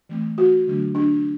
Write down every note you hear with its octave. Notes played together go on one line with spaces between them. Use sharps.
E3 A3 C4
F#4
D3 F#3 A3 D4
D4